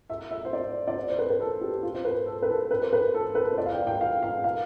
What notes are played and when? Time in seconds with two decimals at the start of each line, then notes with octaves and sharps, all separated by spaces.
0.10 E5
0.31 E5
0.45 C5
0.53 D5
0.87 D5
0.96 C5
1.10 C5
1.19 B4
1.30 B4
1.40 A4
1.61 G4
1.83 F4
1.94 C5
2.05 B4
2.26 A4
2.42 B4
2.49 A4
2.71 B4
2.82 C5
2.93 B4
3.14 A4
3.35 B4
3.52 C5
3.58 D5
3.66 F5
3.72 G5
3.87 G5
4.01 F5
4.23 F5
4.44 F5